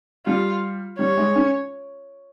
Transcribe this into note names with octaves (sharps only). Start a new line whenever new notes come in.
G3 F4
G3 C#5
G#3
C#4